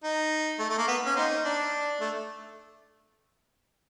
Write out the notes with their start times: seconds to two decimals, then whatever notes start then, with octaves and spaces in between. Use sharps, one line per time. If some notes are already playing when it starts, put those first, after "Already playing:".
0.04 D#4
0.59 A3
0.70 A3
0.78 A#3
0.88 B3
1.06 C#4
1.16 A#3 C4 D#4
1.45 D4
2.00 A3